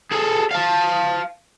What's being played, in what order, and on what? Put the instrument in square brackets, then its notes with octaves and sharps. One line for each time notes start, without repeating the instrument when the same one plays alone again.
[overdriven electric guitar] G#4 A4
F5 A5